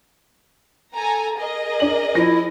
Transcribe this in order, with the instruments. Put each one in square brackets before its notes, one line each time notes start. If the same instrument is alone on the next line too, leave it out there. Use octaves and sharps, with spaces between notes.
[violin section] A4 G#5 A#5
G#4 A#4 D#5
[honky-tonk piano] D4 F#7
[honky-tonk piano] F3 A#6 [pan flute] E4